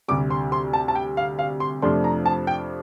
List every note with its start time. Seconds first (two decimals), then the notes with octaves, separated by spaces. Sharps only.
0.08 D2 C3 G3 D6
0.30 C6
0.52 C6
0.73 A5
0.88 A5
0.95 G5
1.17 F5
1.39 F5
1.60 C6
1.82 F2 C3 F3 A3 D4 C6
2.04 A#5
2.26 A5
2.47 G5